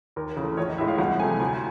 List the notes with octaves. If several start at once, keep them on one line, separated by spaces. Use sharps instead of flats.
D#2 A#4
C#3 E3 A3
A#1 C#5
D#5
A2 E3 G#3 E5
F5
C2 F#5
C3 F3 A3 G#5
D2 G#5